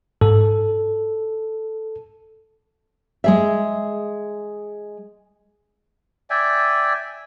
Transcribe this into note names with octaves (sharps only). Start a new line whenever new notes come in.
G#2 A4
G#3 G#4 E5
D5 E5 G5 G#5